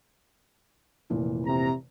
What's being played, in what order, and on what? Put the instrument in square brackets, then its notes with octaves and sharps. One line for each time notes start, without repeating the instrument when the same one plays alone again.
[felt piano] F1 A#2 E3
[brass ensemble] C3 A#5